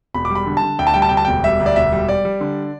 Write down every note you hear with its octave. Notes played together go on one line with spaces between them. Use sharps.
E1 B5
D6
G3
B5
D3
A5
D3
D2 G5
A5
G3 G5
A5
D2 G5
A5
E1 G5
G3 E5
D2
D5
E1 E5
G3
G3 D5
G3
D3